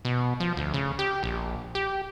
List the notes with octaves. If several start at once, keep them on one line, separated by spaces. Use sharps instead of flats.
B2
F3
D2
C#3
G4
A#1
G4